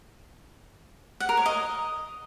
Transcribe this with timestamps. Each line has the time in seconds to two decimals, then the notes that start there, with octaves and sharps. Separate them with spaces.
1.20 F#5
1.29 A#4
1.37 C#5
1.46 D#5